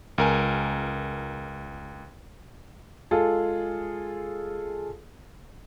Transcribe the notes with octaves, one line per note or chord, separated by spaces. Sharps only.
C#2 A#4 G#5
G#3 F4 G#4 A4